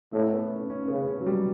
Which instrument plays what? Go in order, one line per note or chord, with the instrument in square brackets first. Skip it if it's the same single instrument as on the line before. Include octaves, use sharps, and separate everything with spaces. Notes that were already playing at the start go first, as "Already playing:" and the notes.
[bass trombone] A2 [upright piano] A3
[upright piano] B3
C#4
C#4
[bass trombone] C#3 [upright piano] B3
[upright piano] C#4
F#3
G3